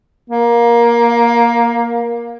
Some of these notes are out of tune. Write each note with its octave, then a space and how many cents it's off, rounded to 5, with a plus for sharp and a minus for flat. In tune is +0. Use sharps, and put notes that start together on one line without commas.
A#3 +15